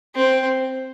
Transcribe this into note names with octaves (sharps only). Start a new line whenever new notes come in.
C4